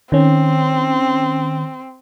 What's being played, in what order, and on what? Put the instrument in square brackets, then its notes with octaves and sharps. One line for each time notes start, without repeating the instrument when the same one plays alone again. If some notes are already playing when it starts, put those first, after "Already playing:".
[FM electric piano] D#3 C#4 [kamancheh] C4